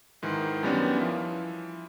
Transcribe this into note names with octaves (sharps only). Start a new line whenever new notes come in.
G#2 D#3 E3
F#2 D#3 G3 B3 C#4 D4
E3 F3